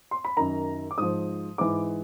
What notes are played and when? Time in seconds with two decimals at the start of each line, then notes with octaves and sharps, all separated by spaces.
0.11 C6
0.25 B5
0.37 F#2 D#3 A#5
0.91 D6
0.98 G#2 F3 D#6
1.58 G#2 E3 D6